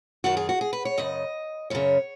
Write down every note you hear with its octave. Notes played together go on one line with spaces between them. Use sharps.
F#2 D#3 F#4
G#4
F#4
G#4
B4
C#5
F#2 C#3 D#5
F#2 C#3 C#5